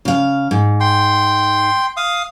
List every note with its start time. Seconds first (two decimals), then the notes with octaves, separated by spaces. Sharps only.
0.05 C#3 F5
0.51 G#2
0.80 G5 C6
1.97 F5 D#6